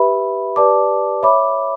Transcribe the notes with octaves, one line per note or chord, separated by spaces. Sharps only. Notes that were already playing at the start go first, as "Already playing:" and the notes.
Already playing: G4 B4 E5 B5
G4 B4 D5 A5 D6
C#5 E5 B5 D6